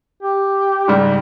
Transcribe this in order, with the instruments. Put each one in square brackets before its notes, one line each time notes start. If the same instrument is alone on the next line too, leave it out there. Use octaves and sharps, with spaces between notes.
[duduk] G4
[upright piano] G#2 C#3 G3